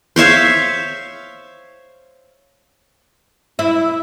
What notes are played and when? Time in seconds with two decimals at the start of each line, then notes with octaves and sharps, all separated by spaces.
0.16 C5 C#5 E5 F5
3.59 E4